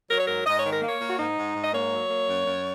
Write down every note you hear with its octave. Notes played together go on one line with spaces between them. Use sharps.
F#3 A#4
C#5
G#2 A#4
G#2 D#5
C#5
D#3
A#4
A#3 C#5
A#3
F#4
G#2 D#4
G#2
G#2
D#5
A#3 C#5
F#3
A#3
F#2
F#2